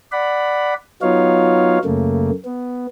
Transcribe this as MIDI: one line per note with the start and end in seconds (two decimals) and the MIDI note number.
0.12 0.74 74
0.12 0.74 78
0.12 0.74 83
1.02 1.78 54
1.02 1.78 59
1.02 1.78 63
1.02 1.78 65
1.02 1.78 73
1.02 1.78 77
1.85 2.31 42
1.85 2.31 49
1.85 2.31 57
1.85 2.31 58
2.45 2.87 59